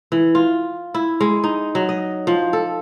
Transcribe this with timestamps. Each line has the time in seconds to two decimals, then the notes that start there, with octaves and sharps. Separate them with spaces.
0.12 E3
0.35 F4
0.94 E4
1.21 G#3
1.44 D#4
1.75 F#3
1.89 D#5
2.27 F3
2.53 A4